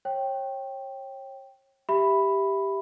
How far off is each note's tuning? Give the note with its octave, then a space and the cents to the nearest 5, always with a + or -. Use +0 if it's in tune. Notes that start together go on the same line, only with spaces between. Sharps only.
C#5 -35 G5 +0
G4 +0 E5 +0 B5 +0